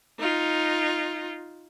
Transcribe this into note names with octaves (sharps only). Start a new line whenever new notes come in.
D#4 F4